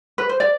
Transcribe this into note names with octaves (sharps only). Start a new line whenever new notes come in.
B4
C5
D5